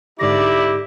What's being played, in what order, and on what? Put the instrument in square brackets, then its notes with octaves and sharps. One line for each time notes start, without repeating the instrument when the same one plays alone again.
[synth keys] G#2 D3 A#6 [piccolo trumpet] E4 [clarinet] G4 [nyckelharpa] D5